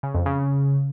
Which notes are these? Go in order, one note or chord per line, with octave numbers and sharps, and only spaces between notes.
C#3
F2
C#3